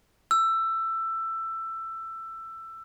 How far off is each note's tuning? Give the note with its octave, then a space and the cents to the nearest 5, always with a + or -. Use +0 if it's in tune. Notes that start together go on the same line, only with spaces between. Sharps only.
E6 +15